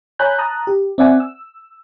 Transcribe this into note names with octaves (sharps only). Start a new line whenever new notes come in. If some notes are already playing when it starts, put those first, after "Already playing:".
C#5 G#5 A#5 B5 F#6 G6
A5 A#5 D#6 F#6
G4
C4 D5 E5 F#5 G#5
E6